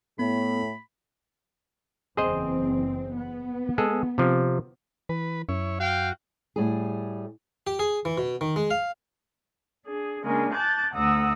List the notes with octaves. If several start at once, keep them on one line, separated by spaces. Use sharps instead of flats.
A2 B3 B5
F#1 E2 C4 G#4 C5 D#5
B3
G#3 G#4 A4
C3 F3
E3 B4
F#2 E4 C#5
F#4 F5 G5
A2 G3 G#4
G4
G#4
E3
B2
D#3
G#3
F5
D4 G#4
C#3 G#3 A#3 D4 A#4
A5 D6 F#6 G6 A6
D2 A3 F#5 A#5 D#6 E6